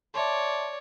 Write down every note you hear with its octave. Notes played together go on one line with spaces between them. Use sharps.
C#5 D5 E5 A5 C6